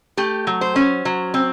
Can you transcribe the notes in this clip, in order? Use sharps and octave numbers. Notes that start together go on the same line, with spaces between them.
A3 G4
F#3
C5
C#4
F#3
C4